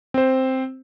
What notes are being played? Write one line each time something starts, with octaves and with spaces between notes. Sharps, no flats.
C4 C5